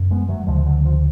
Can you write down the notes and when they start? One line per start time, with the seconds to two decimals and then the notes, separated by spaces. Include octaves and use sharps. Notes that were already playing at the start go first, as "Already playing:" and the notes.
Already playing: F#2 C#3
0.11 G#3 B3
0.29 F#3 A3
0.47 D2 C#3 F3 G#3
0.65 D3 F#3
0.85 F3